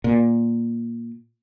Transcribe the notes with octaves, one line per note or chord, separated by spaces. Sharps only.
A#2